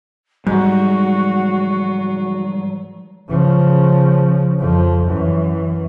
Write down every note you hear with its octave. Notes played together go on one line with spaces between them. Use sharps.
G#2 F#3 G3 F#4
C#3 F3
F2 F3
F#2 E3